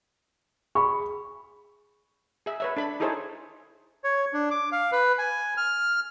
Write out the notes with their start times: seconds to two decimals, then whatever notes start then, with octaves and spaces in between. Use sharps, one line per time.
0.75 G#4 B5 C#6
2.46 G#4 E5
2.60 B4 C#5 E5
2.77 D4 A4 B5
3.00 D#4 E4 G#4 A4 C5 C#5
4.04 C#5
4.33 D4
4.51 D6
4.72 F5
4.92 B4
5.18 G#5
5.57 F6